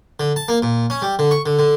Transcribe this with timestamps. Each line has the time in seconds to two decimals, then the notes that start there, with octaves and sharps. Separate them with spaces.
0.20 D3
0.36 A5
0.48 A#3
0.62 A#2
0.90 C#4
1.02 G3
1.19 D3
1.31 C#6
1.46 D3
1.59 D3